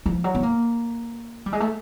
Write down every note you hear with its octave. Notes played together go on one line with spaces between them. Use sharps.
F3
F#3
B3
A#3
G3
G#3
A3